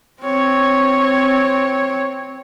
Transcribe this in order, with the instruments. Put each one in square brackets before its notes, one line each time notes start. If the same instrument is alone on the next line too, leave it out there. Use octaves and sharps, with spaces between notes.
[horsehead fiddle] C4 C#5